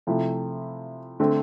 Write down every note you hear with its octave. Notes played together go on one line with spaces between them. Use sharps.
C3 F3 A3 E4
D3 A3 C4